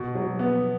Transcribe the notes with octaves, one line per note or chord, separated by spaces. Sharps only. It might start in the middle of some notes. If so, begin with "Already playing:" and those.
Already playing: B2
F#3
B3